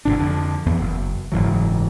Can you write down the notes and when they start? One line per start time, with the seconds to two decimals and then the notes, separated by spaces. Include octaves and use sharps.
0.05 F1 A2 D4
0.18 F2 D3
0.66 E2 B3
0.81 F#1
1.32 F#1 G#2 E3 F#3